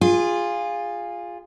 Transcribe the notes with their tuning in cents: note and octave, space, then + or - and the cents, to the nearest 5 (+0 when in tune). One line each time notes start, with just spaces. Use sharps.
F4 +0 G#4 -20